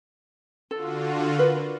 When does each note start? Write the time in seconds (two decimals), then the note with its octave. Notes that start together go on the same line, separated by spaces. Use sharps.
0.71 D3 F4 F#4 A4
1.39 A#4 B4